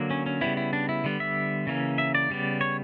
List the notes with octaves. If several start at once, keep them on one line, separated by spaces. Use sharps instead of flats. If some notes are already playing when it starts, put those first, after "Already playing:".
Already playing: D3 F#3 A#3
C#4
C#4
C#3 G3 B3 E4
E4
D4
E4
D3 G3 B3
E5
C#3 E3 A#3 C#4
E5
D5
C#3 G3 B3
C#5